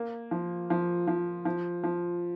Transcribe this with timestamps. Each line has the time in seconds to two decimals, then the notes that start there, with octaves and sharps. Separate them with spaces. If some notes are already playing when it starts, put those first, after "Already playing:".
Already playing: A#3
0.31 F3
0.70 F3
1.08 F3
1.45 F3
1.84 F3